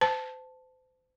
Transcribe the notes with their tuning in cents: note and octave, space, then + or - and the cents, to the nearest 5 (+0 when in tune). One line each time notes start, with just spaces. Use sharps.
C5 -35 A5 +0